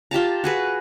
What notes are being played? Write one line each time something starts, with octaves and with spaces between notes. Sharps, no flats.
F4 G4 A5 A#5
F#4 G#4 B4